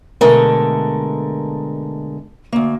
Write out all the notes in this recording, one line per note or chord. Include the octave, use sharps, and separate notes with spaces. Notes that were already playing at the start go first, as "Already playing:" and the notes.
B2 D3 G#3 A3 A4 A#4
D2 A#3